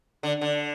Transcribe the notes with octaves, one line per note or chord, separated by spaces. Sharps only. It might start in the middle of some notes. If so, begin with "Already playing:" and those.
D3
D3